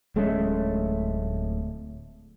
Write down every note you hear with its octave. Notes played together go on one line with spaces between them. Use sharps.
D1 G#3 A3 C#4